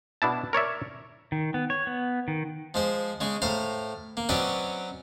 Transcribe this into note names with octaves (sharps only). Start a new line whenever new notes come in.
B2 D4 E4 A5
A#4 C#5 D5 E5
D#3
B3
C#5
B3
D#3
F3 G#3 C5
C#3 G#3 G#4
A2 C5 F5 A#5
A#3
F#3 C4 C#4 B4 D5 D#5